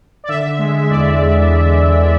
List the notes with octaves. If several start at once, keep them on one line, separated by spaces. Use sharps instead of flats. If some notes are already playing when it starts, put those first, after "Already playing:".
D5
D3 E5
G#3
E2 D5
E2